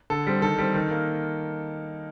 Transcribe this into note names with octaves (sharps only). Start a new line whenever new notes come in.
D3 A4
G3 C4
D#3 A4
G3 C4
D#3
A#3